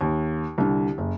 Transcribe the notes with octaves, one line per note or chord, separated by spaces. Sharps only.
D#2
C2 D3
F#1